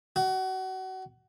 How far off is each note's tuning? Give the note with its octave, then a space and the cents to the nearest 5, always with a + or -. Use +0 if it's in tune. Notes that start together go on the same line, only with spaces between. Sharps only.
F#4 +30